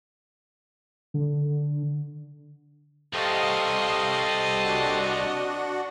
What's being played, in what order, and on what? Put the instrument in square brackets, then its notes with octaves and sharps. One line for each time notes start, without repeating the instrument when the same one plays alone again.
[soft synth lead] D3
[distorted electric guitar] C2 [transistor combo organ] G4 A4 C5 [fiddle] D#5 [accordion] F5 C#6 D#6
[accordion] D4 F#4 F#5